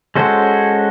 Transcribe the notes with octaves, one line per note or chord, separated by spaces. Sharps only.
G#3 C#4 F#4 A4 C5